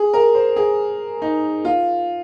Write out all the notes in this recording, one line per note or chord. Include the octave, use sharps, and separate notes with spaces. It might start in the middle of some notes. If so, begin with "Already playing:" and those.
Already playing: G#4
A#4
C5
G#4
D#4
F4